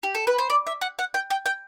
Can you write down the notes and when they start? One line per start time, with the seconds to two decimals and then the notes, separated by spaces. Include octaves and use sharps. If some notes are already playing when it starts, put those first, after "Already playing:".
0.03 G4
0.15 A4
0.27 B4
0.38 C5
0.50 D5
0.67 E5
0.81 F#5
0.99 F#5
1.14 G5
1.30 G5
1.46 G5